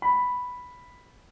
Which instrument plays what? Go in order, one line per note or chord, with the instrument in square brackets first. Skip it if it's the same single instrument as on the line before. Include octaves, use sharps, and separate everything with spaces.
[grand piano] B5